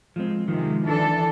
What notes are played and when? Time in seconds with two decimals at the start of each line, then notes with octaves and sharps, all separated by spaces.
0.16 F3 G#3 C4
0.48 C3 D#3 F3 G#3
0.83 E3 D4 A4